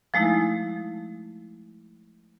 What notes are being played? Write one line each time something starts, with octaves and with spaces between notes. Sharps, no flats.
F3 G#3 A3 D#4 E4